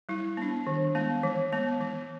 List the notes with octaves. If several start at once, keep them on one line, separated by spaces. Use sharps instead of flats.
G3 E4
B3 D4
D#3
G#3 B3
E3
G#3 B3
E3